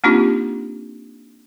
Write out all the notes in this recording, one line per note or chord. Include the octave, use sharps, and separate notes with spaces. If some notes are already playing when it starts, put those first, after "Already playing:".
A#3 C4 D4 D#4 F4 G4